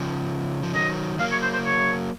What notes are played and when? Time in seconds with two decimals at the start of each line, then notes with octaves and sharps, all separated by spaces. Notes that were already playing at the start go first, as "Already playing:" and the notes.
Already playing: C#3 F3
0.63 F3
0.74 D#3 F#3 D#5
1.19 F#3 A#3 F5
1.31 C#5
1.42 C5
1.53 C5
1.65 C#5